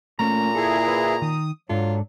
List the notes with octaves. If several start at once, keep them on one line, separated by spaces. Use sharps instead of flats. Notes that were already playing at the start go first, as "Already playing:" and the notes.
A#2 A3 C#4 A#5
E4 G#4 A4
B4
D#3 D#6
G#2 F#3 D4 F4 A4